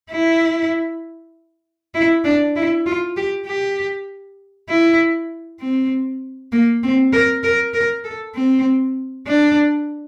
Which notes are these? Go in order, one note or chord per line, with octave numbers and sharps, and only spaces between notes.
E4
E4
D4
E4
F4
G4
G4
E4
C4
A#3
C4
A#4
A#4
A#4
A4
C4
D4